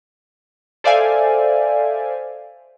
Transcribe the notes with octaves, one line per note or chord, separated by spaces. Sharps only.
A4 C5 D5 E5 F5 G#5